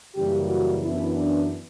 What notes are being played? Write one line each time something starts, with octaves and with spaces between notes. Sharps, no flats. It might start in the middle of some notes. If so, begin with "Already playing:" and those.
F#2 C#3 E3 G3 A#3 G4
F#4
F#2 E3 B3 D4 E4
D4